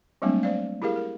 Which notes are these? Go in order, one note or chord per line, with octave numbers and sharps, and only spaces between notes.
F#3 G3 A3 A#3 C4 D4
C5 D5 F5
E4 G4 G#4 A#4 F5
A#4